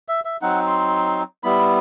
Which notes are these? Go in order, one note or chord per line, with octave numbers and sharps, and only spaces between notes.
E5
E5
F#3 C4 D#4 F#5
C6
G3 B3 E4 B5